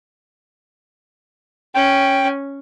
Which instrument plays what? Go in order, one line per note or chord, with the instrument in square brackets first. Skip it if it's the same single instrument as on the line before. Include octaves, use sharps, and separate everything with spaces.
[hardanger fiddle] C#4 [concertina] G5